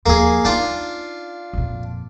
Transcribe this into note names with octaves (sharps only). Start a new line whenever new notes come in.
D#2 F3 A#3 G#4
D4 D#4 F4
F2 A#2